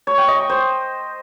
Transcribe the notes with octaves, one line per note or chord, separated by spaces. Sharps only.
C#5
G5
D#5
C#6
C5